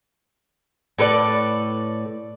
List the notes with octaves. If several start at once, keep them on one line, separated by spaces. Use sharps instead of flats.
A2 A4 B4 D5